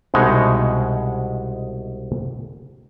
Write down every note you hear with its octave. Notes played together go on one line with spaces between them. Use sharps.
C2 B2 G#3 D#4 F#5